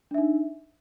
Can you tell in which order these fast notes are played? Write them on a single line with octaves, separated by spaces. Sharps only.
D4 E5 D#4